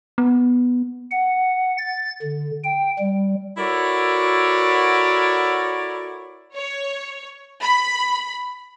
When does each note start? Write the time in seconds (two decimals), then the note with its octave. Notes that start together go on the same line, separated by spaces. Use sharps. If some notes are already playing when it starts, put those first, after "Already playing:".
0.18 B3
1.11 F#5
1.78 A6
2.22 D3
2.64 G5
2.99 G3
3.57 E4 F#4 A4 A#4 C#5 D5
6.55 C#5
7.62 B5